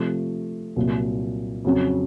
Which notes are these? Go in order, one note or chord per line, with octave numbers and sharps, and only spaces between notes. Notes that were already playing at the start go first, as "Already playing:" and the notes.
Already playing: C3 F3 A3
C2 A#2 F#3
F2 C#3 F#3